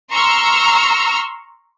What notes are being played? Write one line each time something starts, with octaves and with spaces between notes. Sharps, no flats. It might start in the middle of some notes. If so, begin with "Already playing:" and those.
A#5 C6 C#6 E6 F6